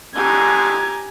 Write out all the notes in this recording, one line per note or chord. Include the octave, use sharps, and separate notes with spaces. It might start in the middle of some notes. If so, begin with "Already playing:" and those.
G#2 B2 D3 G4 G#5 A#5 G#6